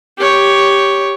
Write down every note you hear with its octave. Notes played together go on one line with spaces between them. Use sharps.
G4 C#5